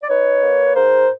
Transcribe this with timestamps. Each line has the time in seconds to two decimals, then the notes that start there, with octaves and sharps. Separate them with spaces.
0.03 D5
0.09 D#4 B4 C#5
0.42 A#3
0.66 B4
0.75 G#2 A#4 C5